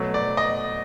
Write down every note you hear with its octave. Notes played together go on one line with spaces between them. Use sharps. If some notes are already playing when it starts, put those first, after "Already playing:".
Already playing: B2 F#3 A3
D5
D#5